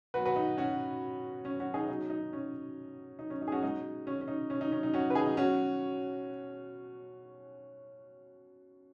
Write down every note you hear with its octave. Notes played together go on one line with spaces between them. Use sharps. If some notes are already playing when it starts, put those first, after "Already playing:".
B2 F#3 F#4 B4
F#4 B4
D#4
C#4 F#4
C#4
C#4 F#4
D#4 G#4
B2 F#3 D#4
D#4
C#4
D#4
C#4
D#4
G#4
C#4 F#4
B2 G#3 D#4
C#4
C#4
D#4
C#4
D#4
C#4
D#4
C#4 F#4
B4
D#4 G#4
D#4
B2 F#3 C#4 F#4